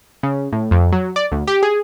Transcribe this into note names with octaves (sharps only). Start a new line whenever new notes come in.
C#3
A2
F2
F#3
D5
D2
G4
G#4